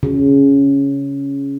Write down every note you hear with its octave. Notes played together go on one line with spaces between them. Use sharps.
C#3